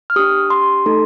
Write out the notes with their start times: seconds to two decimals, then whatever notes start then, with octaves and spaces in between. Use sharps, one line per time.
0.10 F6
0.16 D4 G4 D#6
0.50 C6
0.86 A3 D#4 A4